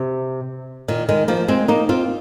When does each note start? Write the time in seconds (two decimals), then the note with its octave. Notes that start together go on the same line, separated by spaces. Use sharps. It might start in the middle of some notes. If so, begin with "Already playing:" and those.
Already playing: C3
0.88 A#2 D#3
1.09 D#3 G#3
1.28 F3 A#3
1.48 G#3 C4
1.68 A#3 D#4
1.89 C4 F4